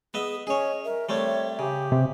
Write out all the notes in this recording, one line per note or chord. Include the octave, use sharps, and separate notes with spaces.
B3 G#4 D#5 E5
C#4 G#4 C#5 D#5
A#4 E5
G3 A3 C4 C#5
C#3 G4
C3